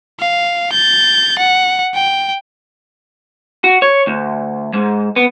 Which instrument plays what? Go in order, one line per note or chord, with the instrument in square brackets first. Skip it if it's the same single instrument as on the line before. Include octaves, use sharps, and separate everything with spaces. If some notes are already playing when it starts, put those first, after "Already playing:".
[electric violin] F5
G6 A6
F#5
G5
[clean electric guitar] F#4
C#5
D2
G#2
B3